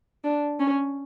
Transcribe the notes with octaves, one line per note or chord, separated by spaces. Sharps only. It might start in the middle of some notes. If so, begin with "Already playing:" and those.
D4
C#4